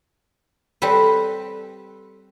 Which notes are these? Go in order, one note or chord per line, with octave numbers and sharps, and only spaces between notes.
G3 C4 A4 B4